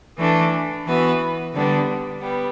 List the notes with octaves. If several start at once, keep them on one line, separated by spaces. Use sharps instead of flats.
E3 A3 D4
E3 B3 F#4 B4
D3 G3 B3 D4
G3 B3